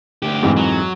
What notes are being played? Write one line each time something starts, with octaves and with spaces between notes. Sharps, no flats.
D2 G4
F2 G#2 E3
F#3